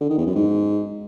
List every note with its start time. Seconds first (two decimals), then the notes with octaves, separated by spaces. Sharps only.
0.01 D3
0.09 D#3
0.18 E2
0.27 F#2
0.35 G#2